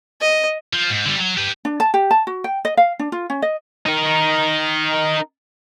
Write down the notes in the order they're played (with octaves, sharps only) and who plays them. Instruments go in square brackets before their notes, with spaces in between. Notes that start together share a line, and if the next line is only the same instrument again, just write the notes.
[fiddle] D#5
[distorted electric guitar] F3
G#2
D3 G3
F#3
G4 B4
[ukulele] D4
A5
G4
A5
F#4
G5
D#5
F5
D4
F4
C#4
D#5
[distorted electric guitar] D#4 A#4